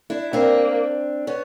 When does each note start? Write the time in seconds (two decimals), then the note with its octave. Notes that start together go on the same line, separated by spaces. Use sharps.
0.10 D4 E4
0.33 A#3 C4 D4
1.27 B3 C#4